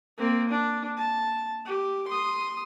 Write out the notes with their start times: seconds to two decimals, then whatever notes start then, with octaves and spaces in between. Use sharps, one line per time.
0.17 A#3 C4
0.49 D4
0.97 A5
1.65 G4
2.08 C6 D#6